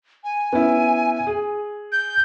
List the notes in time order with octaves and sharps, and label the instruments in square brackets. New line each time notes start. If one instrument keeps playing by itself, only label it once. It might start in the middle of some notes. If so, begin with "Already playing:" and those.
[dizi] G#5
[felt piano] B3 C#4 E4
G#4
[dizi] G6